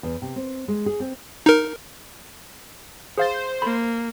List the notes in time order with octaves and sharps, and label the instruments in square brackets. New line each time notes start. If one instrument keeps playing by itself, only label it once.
[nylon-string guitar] E2
C3
C4
G#3
G#4
C4
[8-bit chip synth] D#4 A#4
[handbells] G#4 F5 A6 [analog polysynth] C5
[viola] A#3 [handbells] B5